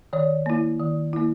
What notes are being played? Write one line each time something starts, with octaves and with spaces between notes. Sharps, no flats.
D#3 C#5
A#3 E4
D#3
A#3 E4